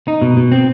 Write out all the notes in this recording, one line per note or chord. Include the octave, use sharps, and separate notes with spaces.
D#4
B2
B2
C4